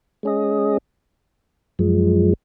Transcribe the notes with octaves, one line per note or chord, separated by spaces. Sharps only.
G#3 C#4 G#4 D#5
F#2 F3 G#3